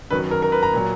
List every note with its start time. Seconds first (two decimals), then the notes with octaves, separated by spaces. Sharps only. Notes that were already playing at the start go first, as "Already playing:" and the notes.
0.10 F#2 D#3 F#3 B4
0.31 A#4
0.42 A#4
0.52 B4
0.63 A#5
0.73 A#2 F#3